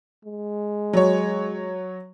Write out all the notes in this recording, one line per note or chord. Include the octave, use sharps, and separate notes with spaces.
G#3
F#3 C#5